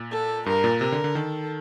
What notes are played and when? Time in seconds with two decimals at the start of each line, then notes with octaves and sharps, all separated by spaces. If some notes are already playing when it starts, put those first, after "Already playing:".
Already playing: A#2
0.11 A4
0.46 G2 A#4
0.64 A#2
0.81 C3 A#4
0.92 D3
1.04 D3
1.15 D#3 A4